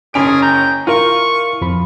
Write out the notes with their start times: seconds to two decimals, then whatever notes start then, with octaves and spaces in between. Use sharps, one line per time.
0.14 F#1 C#4 G#4 D7
0.42 G5 A#5
0.87 E4 F4 A#4 C#6
1.61 F2 F3 B5